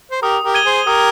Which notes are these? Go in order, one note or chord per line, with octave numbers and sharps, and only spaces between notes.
C5
G4 A#4 D#6
G4 A#4
G#6 D#7 G7
G#4 C5
G4 A#4 D#6